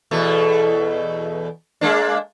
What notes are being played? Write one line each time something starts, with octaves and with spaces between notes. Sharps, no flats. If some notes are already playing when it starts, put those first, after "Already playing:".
E2 B2 A3
G#3 A#3 D4